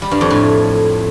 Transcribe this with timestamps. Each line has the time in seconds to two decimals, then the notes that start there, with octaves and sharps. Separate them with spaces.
0.02 G3
0.11 G2
0.21 F2
0.30 A2